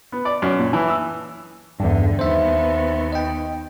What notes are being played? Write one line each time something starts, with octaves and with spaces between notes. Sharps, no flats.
B3
D5
F#2
A#2
E3
E6
E2 G2 D3
D#2 B3 C5 E5
D#5 G5